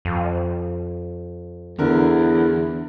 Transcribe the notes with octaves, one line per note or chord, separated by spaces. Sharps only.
F2
E2 D3 A#4